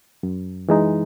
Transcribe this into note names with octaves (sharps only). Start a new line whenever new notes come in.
F#2
E3 G#3 D#4